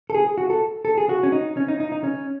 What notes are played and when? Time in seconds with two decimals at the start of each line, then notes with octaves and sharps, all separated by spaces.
0.10 A4
0.15 G#4
0.38 F#4
0.50 A4
0.85 A4
0.98 G#4
1.09 F#4
1.23 C#4
1.32 D#4
1.57 C#4
1.68 D#4
1.80 D#4
1.92 D#4
2.04 C#4